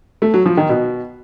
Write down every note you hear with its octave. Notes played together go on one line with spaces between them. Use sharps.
A3
F#3
F3
D#3
B2